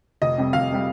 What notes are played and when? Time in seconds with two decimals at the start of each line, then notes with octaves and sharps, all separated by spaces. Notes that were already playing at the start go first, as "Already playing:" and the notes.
0.22 F1 D#5
0.38 F2 C3 G3
0.53 F1 F5
0.72 C3 G3